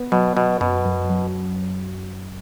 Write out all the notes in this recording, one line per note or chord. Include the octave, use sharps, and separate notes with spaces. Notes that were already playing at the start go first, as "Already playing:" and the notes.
Already playing: B3
B2 F#3
B2 F#3
F#2 B2
F#2
F#3